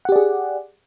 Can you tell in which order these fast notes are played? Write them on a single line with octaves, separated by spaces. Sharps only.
F#5 G4 D5 G#4